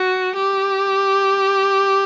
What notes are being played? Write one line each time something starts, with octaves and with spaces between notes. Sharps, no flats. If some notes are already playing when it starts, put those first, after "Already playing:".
Already playing: F#4
G4